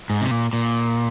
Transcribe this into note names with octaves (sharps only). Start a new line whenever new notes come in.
G#2
C3
A#2
A#2